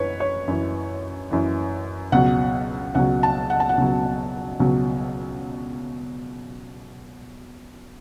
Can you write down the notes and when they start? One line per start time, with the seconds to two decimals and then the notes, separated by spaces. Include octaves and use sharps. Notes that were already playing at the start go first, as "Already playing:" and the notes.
Already playing: F#2 E3 B4 C#5
0.20 C#5
0.48 F#2 E3
1.31 F#2 E3
2.12 C#2 B2 F#3 F#5
2.95 C#2 B2 F#3 F#5
3.23 A5
3.50 F#5
3.60 A5
3.69 F#5
3.77 C#2 B2 F#3
4.60 C#2 B2 F#3